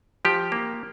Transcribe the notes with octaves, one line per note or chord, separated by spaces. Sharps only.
F3 G4
A#3